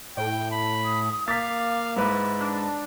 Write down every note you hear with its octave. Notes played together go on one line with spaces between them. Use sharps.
A2 G5
A5 B5
D#6
A#3 F5 D6 A6 B6
G#2 E4 B4
D4